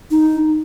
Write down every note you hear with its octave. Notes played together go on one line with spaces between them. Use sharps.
D#4